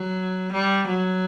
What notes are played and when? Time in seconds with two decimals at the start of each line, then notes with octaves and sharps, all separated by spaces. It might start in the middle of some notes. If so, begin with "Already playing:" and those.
Already playing: F#3
0.53 G3
0.88 F#3